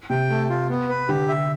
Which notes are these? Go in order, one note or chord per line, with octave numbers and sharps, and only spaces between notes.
C3 G5
A3
F4
B3
B4
D3 G4
E5